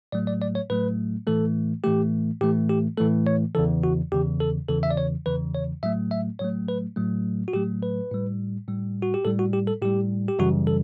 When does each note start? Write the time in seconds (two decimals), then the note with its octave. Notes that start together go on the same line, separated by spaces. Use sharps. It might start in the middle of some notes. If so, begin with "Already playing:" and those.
0.12 A2 F#3 A3 D5
0.27 D5
0.42 D5
0.55 C#5
0.70 A2 F#3 A3 B4
1.27 A2 E3 A3 A4
1.84 A2 E3 A3 G4
2.41 A2 E3 A3 G4
2.69 G4
2.98 A2 E3 A3 A4
3.27 C#5
3.55 E2 C#3 E3 A4
3.84 F#4
4.12 E2 C#3 E3 G4
4.40 A4
4.69 E2 C#3 E3 A4
4.83 E5
4.91 D5
4.97 C#5
5.26 E2 C#3 E3 B4
5.54 C#5
5.83 A2 F#3 A3 E5
6.11 E5
6.39 A2 F#3 A3 C#5
6.69 B4
6.96 A2 F#3 A3
7.48 F#4
7.53 A2 F#3 A3 G4
7.83 B4
8.11 A2 G3
8.68 A2 G3
9.02 F#4
9.14 G4
9.25 A2 G3 A4
9.39 F#4
9.53 G4
9.67 A4
9.82 A2 G3 G4
10.28 G4
10.39 F#2 C#3 E3 G3 F#4
10.67 A4